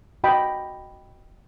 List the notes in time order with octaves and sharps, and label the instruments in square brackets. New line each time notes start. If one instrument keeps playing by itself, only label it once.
[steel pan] F#4 D#5 G5 B5